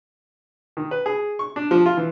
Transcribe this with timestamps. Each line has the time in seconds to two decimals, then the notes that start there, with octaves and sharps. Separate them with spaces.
0.77 D#3
0.91 B4
1.06 G#4
1.39 C#6
1.56 D4
1.71 F3
1.86 F4
1.97 E3